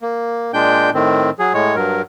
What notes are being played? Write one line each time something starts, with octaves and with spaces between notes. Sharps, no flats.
A#3
A#2 G#3 D4 G5 G6
A2 D#3 C4
F#3 G#4
A2 G#3 C#5
G2 F#3 A#4